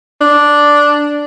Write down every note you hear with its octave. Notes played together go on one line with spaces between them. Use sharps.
D4